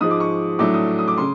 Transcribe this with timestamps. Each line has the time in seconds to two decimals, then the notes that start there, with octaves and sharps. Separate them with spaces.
0.01 G#2 F3 G#3 D#6
0.11 D6
0.20 C#6
0.59 A2 F#3 A3 D4 D6
0.74 D#6
0.99 D#6
1.08 D6
1.18 C#3 C6